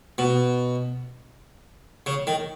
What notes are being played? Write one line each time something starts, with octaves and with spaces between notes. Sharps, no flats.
B2
C#3
D#3